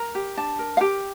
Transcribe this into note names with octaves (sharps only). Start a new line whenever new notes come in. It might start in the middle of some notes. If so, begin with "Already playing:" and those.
Already playing: A#4 A#5
G4
D4 A5
A#4
F5
G4 G5